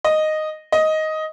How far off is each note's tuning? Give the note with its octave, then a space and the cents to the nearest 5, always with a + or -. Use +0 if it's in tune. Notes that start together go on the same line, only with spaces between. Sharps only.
D#5 -5
D#5 +10